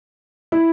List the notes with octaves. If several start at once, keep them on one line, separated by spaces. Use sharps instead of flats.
E4